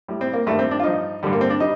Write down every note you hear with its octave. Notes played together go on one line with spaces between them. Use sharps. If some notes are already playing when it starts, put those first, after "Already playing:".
A2 G3
C4
A#3
G2 D#3 G3 A3
C4
D4
F4
G2 F3 D#4
G2 D3 G3
A#3
C4
D4
G3 D#4